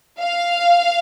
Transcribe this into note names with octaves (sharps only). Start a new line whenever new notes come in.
F5